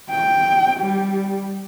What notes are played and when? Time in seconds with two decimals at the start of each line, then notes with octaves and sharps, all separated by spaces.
0.10 G5
0.80 G3